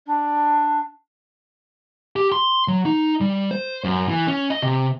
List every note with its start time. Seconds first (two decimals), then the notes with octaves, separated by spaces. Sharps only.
0.07 D4
2.16 G4
2.32 C6
2.68 F#3
2.86 D#4
3.21 G3
3.51 C5
3.84 F#2
4.07 E3
4.28 C#4
4.50 D#5
4.62 C3